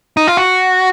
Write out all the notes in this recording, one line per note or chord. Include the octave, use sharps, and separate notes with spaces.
D#4
F4
F#4